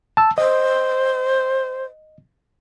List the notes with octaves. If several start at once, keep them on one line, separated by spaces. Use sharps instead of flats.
A5 E6
C5 D#5